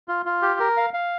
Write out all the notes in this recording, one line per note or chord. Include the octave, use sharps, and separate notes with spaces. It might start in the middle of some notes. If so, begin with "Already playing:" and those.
F4
F4
G4
A#4
F5
F5